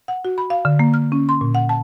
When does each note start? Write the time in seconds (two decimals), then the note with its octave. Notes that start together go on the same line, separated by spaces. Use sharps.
0.08 F#5
0.25 F#4
0.38 B5
0.50 F5
0.65 D3
0.79 A#3
0.94 F6
1.12 C#4
1.29 C6
1.41 A#2
1.55 F#5
1.69 A5